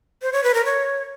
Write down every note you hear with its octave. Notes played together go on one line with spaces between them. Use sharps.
C5
C#5
B4
A#4
C#5